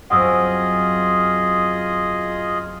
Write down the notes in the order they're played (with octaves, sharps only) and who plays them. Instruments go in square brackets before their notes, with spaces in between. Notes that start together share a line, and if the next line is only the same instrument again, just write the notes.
[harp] F#2 C4 [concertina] F4 G#4 D#5 [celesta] F#5 D#6 E6